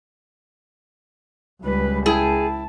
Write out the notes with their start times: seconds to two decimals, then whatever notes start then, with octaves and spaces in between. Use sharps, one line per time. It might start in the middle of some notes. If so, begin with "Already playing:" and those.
1.63 C#2 G3 B4
2.06 E4 G#4 G5 A5